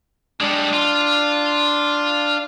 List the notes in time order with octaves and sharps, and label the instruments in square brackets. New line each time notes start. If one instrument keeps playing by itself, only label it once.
[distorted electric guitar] G3 G#3 [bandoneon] D4
[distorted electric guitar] F4